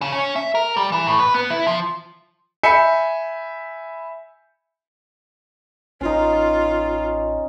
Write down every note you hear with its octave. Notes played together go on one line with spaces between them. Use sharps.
C#3
C#4
E5
A#4
G3
E3
A2
B4
B3
E4
F3
E5 G#5 B5 G6 C#7
A1 C#4 D#4 F4